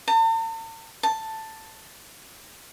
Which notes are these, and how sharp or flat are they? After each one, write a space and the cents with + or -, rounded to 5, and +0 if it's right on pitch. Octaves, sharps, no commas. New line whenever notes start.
A5 +45
A5 +5